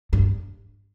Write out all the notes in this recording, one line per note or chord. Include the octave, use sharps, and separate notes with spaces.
G2